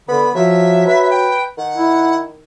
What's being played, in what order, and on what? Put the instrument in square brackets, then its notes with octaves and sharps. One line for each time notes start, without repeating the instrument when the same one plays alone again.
[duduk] D3 [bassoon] B3 [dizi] B5
[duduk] F3 [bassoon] F#3 [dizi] E5
[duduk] B4
[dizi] G5
[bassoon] D#3 [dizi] F#5
[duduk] E4